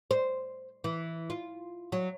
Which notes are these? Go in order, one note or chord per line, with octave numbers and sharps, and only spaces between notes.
C5
E3
F4
F#3